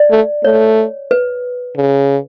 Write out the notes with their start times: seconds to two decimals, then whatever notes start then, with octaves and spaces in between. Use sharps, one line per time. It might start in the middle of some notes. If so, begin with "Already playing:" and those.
Already playing: D5
0.11 A3
0.44 A3 C#5
1.11 B4
1.77 C#3